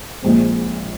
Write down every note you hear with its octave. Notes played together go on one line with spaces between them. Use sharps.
A#1 A#2 G#3 C4